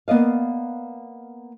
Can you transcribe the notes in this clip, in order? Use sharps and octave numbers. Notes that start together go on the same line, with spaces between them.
A#3 B3 D5 D#5 F5